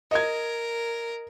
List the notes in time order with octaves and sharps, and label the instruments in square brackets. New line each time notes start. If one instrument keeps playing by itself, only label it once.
[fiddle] A#4 [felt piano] D#5 G#6